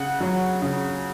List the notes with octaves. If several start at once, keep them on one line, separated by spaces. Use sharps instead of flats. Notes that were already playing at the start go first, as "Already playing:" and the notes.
Already playing: C#3 F#5
F#3
C#3